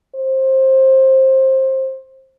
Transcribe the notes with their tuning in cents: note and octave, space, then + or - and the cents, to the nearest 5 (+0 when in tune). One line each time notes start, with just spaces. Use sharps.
C5 +20